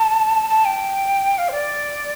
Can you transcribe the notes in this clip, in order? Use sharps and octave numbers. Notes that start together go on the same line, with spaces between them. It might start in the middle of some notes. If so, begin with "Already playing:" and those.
Already playing: A5
A5
G5
F5
C5
D5